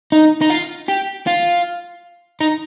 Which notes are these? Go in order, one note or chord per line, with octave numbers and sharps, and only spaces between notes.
D#4
D#4
F4
G4
F4
D#4